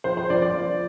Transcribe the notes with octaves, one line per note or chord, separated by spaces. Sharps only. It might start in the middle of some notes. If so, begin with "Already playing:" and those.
F3 C5
C5
F3 D5
D5
F3